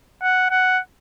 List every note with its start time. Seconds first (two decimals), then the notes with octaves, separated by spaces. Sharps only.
0.22 F#5
0.51 F#5